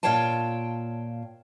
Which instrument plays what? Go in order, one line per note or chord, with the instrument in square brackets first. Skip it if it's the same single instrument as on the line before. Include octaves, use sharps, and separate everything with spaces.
[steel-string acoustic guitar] A#2 F4 C#5 F5 G5 A5